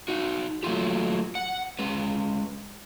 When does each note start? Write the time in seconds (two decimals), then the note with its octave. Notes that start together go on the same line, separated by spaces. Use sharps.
0.08 D#4 F#4
0.63 F#3 A3 A#3 F4 G4
1.35 F#5
1.79 G#3 C#4 B4